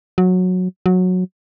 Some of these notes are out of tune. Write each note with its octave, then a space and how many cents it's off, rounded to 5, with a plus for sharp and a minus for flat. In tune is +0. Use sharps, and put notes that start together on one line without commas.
F#3 -15
F#3 -15